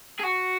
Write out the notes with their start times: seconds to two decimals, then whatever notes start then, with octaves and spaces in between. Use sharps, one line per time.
0.20 G#4
0.24 F#4